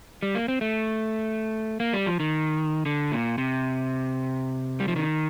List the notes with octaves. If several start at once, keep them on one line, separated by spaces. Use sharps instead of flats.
G3
A#3
C4
A3
A#3
G3
F3
D#3
D3
A#2
C3
G3
F3
D#3